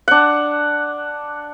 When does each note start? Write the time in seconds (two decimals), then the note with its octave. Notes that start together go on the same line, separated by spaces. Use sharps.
0.08 D4 F#5